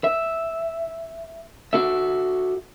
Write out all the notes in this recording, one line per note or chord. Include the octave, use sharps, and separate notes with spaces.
E5
F#4 A4 E5